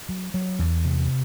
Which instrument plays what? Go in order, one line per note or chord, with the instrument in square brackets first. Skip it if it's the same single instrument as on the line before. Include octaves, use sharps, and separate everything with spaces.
[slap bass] F#3
F#3
E2
C3